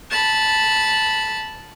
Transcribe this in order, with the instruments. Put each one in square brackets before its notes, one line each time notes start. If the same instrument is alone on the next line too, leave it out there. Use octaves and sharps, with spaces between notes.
[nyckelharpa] A5 B5